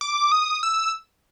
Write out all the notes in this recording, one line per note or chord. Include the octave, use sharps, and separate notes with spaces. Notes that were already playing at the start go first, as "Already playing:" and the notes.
D6
D#6
E6